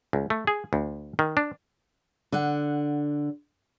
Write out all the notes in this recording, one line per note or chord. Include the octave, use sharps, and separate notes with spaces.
C#2
A3
G#4
D2
D#3
D4
D3 F#5